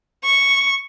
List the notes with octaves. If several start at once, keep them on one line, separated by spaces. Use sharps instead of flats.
C#6